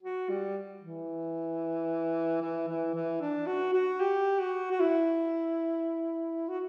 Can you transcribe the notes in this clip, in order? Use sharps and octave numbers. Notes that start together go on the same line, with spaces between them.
F#4
G3
E3
E3
E3
E3
D4
F#4
F#4
G4
F#4
F#4
E4
F#4